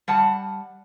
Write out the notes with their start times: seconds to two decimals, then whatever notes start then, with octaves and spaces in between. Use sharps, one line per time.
0.08 G3 F#5 A5